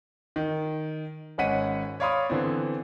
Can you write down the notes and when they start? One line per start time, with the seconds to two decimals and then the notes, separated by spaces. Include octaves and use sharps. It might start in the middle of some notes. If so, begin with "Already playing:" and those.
0.36 D#3
1.38 G#1 G#3 C#4 F#5 B6 D#7
2.00 C#5 D5 F5 B5 C6 D#6
2.29 D3 E3 B3 C4